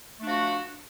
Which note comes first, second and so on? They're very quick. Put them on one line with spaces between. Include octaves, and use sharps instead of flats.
A3 D4 F3 F#4